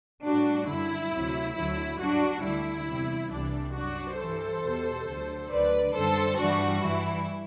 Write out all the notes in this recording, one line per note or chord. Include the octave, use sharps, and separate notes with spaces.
A2 G3 D4 F#4
F#2 D3 G3 E4
D2 C3 F#3
D2 D3 F#3 E4
G2 F#3 D4 F#4
D2 D3 G3 E4
E2 C3 G3
C2 C3 E3 G3 D4
F#2 F#3 D4 F#4
G2 E3 G3 A4 C5
E2 B2 G3
D2 D3 F#3
D2 D3 F#3 B4 D5
F#2 D3 G3 A4 C5
G2 E3 G3 D4 F#4
G2 E3 G3 E4